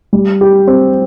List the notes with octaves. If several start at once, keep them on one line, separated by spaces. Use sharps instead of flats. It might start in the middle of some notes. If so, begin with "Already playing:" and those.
G3
G4
C4